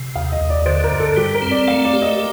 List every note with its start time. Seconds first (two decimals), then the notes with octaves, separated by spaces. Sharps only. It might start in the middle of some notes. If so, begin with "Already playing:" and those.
Already playing: C3
0.16 D#2 F5
0.32 D#5
0.41 D#2
0.50 D5
0.66 D3 C5
0.84 A#4
0.92 G2
1.00 A4
1.16 G3 G4
1.34 A#4
1.42 C4
1.51 D5
1.68 A3 F5
1.85 D5
1.93 G4
2.02 D#5